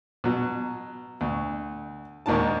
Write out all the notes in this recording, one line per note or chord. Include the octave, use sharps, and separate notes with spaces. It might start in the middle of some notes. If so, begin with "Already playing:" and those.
B2 F#3
D2
D#2 G#2 D#3 D4 A5